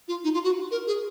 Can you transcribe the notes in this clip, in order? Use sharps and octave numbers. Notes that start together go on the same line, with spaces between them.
F4
D#4
F4
F#4
A#4
G#4